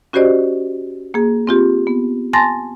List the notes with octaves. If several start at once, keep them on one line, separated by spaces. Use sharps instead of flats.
C#4 F#4 G4 C5 D5 D#5
A#3 G#4
C4 F4 G4
B3
G#5 A5 C6 A6 A#6